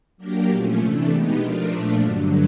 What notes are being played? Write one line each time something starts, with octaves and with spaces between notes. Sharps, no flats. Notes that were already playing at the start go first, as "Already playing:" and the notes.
F#3 A#3 D4 G4 A#4
A#2 F3 A3 C#4
C3 E3 A3 D4
B2 G#3 B3 D#4 G4
F3 A3 D4 F4 A#4
A#2 F3 A3 D4
G2 D3 F#3